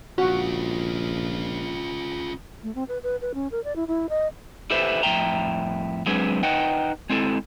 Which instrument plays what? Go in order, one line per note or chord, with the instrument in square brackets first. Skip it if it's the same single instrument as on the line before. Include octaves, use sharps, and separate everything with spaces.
[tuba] A#1 [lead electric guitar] C#4 F4 [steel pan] F#4
[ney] A3
C4
B4
B4
B4
C#4
A#4
D5
E4
E4
D#5
[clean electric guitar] E4 G4 A4 B4 C5 E5
F2 A2 E5 G5 A#5
F#3 G#3 C4 D4 G#4 B4
D#4 B4 D#5 F#5 G5
G#3 C4 E4 A4